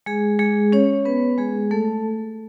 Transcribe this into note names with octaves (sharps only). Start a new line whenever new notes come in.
G#3 G#4
G#3 G#4
C#4 C#5
B3 B4
G#3 G#4
A3 A4